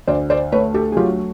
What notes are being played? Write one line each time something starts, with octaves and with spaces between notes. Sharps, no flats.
D2 C5 D5
C5 D5
A3 B4 C#5
G4 A4
G#4
F#3 F4 G4